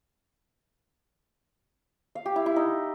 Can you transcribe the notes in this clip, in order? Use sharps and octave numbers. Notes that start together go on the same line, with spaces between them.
F5
G4
E4
E4
D#4